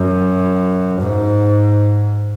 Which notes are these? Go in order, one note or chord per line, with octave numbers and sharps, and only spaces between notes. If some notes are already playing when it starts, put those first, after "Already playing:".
Already playing: F#2
G#2